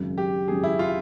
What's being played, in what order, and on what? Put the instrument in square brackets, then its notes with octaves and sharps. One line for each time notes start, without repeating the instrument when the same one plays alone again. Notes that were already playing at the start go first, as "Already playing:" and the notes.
Already playing: [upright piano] G#1 F#2 C#3 F#3
[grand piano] G4
[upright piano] G#1 F#2 C#3 F#3 [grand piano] G#4
[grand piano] E4
F4